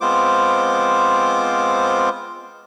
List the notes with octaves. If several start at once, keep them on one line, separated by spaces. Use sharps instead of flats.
G#3 B3 C4 F4 C5 D6